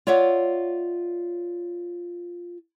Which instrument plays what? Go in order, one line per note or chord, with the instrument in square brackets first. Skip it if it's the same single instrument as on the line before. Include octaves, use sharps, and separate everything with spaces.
[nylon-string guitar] F4 C#5 D5 E5 F#5